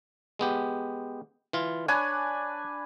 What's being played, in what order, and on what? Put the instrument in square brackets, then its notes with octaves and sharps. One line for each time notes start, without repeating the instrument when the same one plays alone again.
[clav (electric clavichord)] G#3 B3 G4
E3 F4
[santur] D4 B4 G#5 [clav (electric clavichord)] C#5